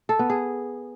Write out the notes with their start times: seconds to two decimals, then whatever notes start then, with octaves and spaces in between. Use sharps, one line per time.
0.09 A4
0.19 B3
0.30 G#4